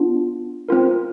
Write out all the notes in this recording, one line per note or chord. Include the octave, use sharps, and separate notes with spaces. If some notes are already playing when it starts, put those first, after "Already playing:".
Already playing: B3 D4 F4
C4 F4 A#4